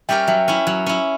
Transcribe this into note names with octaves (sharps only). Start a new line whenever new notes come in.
G3 C#4 G4 A#4 E5 G5
F#3 E5 G5
C#4 E4
F#3
C#4 E4